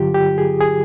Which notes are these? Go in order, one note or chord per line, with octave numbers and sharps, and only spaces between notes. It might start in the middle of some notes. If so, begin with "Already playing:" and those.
Already playing: G2 D3 F#3 F4 G4
G4
G#4
G#4